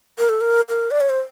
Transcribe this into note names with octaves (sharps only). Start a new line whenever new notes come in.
A#4
A4
A#4
A#4
D5
C#5
C5